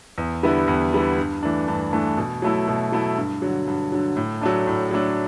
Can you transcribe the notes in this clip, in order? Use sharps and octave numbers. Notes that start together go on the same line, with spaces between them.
E2
D3 G3 B3 E4
E2
D3 G3 B3 E4
G2
E3 A3 D4
G2
E3 A3 D4
B2
F#3 A3 E4
B2
F#3 A3 E4
G2
D3 F#3
G2
D3 F#3
A2
F#3 A3 D4
A2
F#3 A3 D4